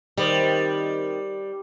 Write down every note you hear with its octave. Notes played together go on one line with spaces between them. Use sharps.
D#3 G3 C4